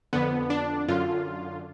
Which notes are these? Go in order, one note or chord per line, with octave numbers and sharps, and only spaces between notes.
F2 D3 B3
D4
F#2 D3 F4